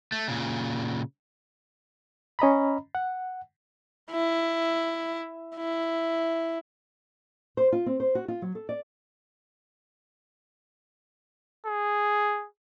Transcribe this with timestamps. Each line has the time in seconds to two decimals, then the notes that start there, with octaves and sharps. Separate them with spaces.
0.12 A3
0.28 A#2 C#3
2.39 C#4 D#5 A#5 B5
2.95 F#5
4.11 E4
5.57 E4
7.57 C5
7.72 F4
7.86 C4
8.00 C5
8.15 F#4
8.28 F4
8.42 F#3
8.55 A4
8.69 D5
11.66 G#4